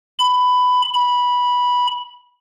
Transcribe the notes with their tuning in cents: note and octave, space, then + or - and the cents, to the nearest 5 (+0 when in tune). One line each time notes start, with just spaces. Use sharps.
B5 +15
B5 -10